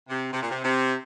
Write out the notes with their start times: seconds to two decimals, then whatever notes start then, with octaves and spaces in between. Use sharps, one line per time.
0.09 C3
0.32 C3
0.42 A#2
0.50 C3
0.64 C3